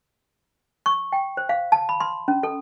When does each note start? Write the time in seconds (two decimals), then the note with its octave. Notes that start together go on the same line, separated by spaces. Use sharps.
0.86 C#6
1.12 G5
1.37 C5
1.49 F5
1.72 A5
1.89 B5
2.00 C6
2.28 C#4
2.43 A4